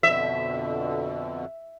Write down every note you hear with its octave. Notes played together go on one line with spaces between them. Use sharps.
F2 B2 D3 E5